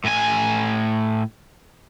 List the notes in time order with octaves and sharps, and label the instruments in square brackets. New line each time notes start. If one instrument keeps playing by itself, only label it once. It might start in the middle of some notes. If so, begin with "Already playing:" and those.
[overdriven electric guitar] A2 G#5